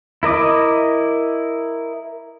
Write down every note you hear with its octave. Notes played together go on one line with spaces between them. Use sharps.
E4 A#4 D#5 D6